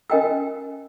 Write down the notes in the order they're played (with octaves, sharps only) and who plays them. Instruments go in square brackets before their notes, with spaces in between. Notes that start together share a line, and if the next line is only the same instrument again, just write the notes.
[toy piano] C#4 A#4 D#5 G5 G#5 E6